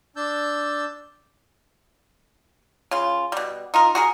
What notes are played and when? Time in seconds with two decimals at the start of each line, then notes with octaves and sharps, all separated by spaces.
0.16 D4 A5 E6 G6
2.91 C#3 F4
3.32 B2 G3
3.74 D#4 F4 A#4
3.95 F#4 G#4 A#4